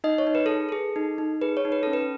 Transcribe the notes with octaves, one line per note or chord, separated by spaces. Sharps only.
D#4 D#5
C#5
D#4
B4
G#4 A4
G#4 A4
D#4
D#4
G#4 B4
C#5
D#4
B4
C#4 A4
B4